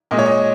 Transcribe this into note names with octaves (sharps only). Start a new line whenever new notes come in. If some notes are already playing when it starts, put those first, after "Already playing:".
A#2 G#3 D#5
C#5
D#5